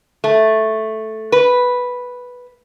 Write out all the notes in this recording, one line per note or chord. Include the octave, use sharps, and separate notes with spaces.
A3
B4